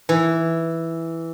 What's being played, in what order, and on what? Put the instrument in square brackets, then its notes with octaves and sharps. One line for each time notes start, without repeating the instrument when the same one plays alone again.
[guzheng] E3